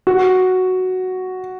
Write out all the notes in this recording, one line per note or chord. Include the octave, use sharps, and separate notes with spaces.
F#4